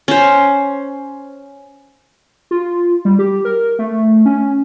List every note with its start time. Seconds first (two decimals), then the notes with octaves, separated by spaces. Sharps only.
0.08 C#4 C5
2.51 F4
3.05 G3
3.19 G4
3.45 A#4
3.79 A3
4.26 C#4